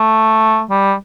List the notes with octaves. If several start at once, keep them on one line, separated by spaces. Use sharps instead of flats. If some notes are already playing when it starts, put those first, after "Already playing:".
Already playing: A3
G3